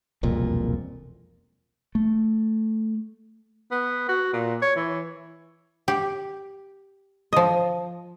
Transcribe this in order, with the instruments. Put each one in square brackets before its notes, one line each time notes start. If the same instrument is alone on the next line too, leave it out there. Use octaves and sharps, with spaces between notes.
[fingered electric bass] E1 C2 F2 A#2
A3
[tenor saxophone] B3
F#4
A#2
C#5
E3
[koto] G4
F3 D#5